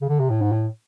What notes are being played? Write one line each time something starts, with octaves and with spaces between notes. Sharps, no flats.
C#3
D3
C3
A2
G#2
A2